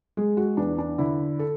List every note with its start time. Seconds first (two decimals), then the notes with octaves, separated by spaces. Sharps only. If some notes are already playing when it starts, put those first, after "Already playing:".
0.17 G#3 G#4
0.37 F#4
0.57 E2 D4
0.78 D4
0.98 D3 E4
1.39 A4